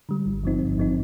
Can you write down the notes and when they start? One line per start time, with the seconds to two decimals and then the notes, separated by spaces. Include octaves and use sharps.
0.09 D3 G3
0.26 G#1
0.43 G2 F3 C4 D#4
0.61 G#1
0.78 G2 F3 C4 D#4